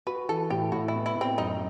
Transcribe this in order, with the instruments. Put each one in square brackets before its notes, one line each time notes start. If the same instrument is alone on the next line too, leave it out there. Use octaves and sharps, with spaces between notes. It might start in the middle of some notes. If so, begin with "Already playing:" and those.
[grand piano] F#4 [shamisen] B4
[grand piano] E3 [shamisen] A4
[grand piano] A2 [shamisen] G4
[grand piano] A2 [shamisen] F#4
[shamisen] E4
[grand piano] B3
[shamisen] E4
[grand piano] A2
[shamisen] C4
[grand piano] F#2 [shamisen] D#4